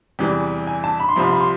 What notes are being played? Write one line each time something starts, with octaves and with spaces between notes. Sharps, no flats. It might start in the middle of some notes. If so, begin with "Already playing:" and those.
E2 C3 E3 G3
G#5
A5
B5
C6
C2 C3 F3 B5
C6
B5
C6